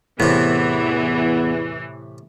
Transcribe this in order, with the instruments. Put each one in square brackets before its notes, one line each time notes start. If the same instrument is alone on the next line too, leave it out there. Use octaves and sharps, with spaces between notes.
[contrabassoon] E2 [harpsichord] A2 C3 [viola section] E3 [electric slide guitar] B3